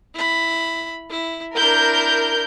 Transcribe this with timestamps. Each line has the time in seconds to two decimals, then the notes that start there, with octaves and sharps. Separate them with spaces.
0.14 E4 B5
1.10 E4
1.55 D4 E4 A#4 G6